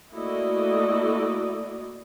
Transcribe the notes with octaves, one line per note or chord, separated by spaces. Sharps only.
A3 A#3 E4 F#4 D5 D#5